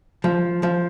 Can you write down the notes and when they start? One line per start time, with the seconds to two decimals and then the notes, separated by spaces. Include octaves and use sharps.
0.24 F3
0.63 F3